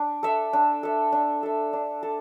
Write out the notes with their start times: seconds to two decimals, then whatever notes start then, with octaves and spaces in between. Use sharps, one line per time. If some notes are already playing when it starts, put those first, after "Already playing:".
Already playing: D4
0.23 A4 E5
0.53 D4
0.83 A4 E5
1.12 D4
1.43 A4 E5
1.73 D4
2.03 A4